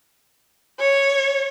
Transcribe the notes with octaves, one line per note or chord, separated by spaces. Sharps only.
C#5